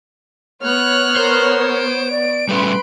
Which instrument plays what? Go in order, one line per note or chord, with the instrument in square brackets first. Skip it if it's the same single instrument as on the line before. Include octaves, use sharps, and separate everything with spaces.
[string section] B3 C#5 [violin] F6 F#6
[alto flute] A#4 [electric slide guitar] C5
[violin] D7
[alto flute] D5
[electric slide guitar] G3 A3 C#4 [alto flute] B4 [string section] B5 C6